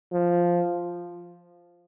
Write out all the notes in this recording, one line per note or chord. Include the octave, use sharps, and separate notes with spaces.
F3